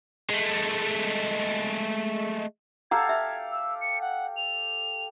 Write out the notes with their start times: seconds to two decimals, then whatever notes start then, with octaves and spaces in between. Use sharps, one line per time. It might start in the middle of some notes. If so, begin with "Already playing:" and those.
0.30 G#3 A3
2.91 G4 A4 F5 F#5 A#5 G#6
3.09 E5
3.52 E6
3.81 C#7
4.01 F#5
4.37 F7